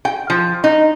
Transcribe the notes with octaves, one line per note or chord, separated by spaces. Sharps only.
G5
F3
D#4